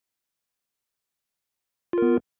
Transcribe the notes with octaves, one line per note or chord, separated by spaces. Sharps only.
B3 F4 A#4